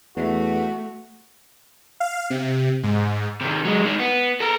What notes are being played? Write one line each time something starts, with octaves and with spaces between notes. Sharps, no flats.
E2 A3 F#4
F5
C3
G#2
C3 D#3
F#3 G#3
D#3 G#3
B3
A4 A#4